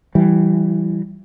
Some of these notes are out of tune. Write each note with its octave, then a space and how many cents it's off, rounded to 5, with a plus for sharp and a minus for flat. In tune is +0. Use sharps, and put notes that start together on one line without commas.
E3 +10 G3 -20